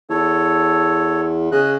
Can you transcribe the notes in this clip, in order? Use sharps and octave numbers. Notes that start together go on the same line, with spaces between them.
E2 A4 C#5
C#3 D#5 F#6